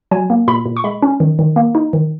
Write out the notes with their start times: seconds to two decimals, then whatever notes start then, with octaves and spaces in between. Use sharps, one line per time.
0.11 F#3 G#5
0.30 A#3
0.48 A#2 B5
0.66 A#2
0.77 C#6
0.84 G#3 B5
1.02 C#4
1.20 D#3
1.39 D#3
1.56 A#3
1.75 D#4
1.93 D#3